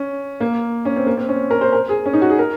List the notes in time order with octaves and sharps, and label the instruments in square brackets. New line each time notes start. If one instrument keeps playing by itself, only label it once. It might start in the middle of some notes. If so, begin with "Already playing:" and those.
Already playing: [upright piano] C#4
A#3
C#4
C4
A#3
C4
C#4
A#4
C5
A#4
G#4
C#4
D#4
F#4
G#4
A#4